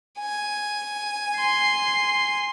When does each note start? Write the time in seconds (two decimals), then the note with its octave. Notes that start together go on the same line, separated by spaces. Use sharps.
0.19 G#5
1.40 C6 C7